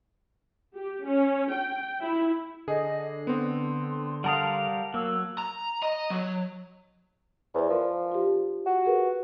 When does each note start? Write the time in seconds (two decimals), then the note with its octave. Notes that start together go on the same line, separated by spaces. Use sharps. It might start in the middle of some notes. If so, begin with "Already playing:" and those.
0.74 G4
1.07 C#4
1.53 G5
2.02 E4
2.68 D3 G#4 D#5
3.27 B3 C4 C6
4.24 G3 A#4 F5 F#5 A5 D#6
4.94 F#3 A#3 E6
5.38 A#5
5.82 D#5
6.10 F#3
7.55 E2 C5 D5
7.70 F3 A#4
8.12 F4 G4
8.66 F#4
8.85 G#4 A#4 B4